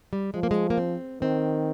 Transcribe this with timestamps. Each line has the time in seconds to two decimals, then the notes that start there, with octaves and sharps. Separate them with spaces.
0.13 G3
0.34 F3 G#3
0.43 A#3
0.51 G#3
0.70 A#3
0.77 C4
1.21 D#3 C4